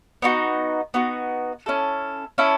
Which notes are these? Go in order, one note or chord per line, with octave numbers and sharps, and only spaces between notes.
B3 D#4 F#4
B3 D#4 F#4
C#4 E4 A4
C#4 E4 A4